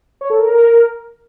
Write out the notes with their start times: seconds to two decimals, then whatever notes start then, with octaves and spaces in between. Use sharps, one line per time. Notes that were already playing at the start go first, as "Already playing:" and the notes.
0.21 C#5
0.30 A4
0.39 A#4